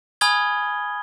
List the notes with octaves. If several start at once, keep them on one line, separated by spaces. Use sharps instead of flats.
G#5 B5 D#6 F6 G#6 G7